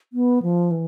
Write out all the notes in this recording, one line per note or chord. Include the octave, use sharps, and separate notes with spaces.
B3
F3
E3